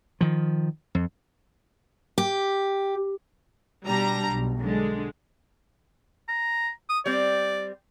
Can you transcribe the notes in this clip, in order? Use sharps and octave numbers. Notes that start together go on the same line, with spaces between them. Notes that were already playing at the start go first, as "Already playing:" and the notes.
D#3 F3
F2
G4
B2 G3 D4 A#5
B1
D3 G#3
A#5
D#6
G3 C4 D5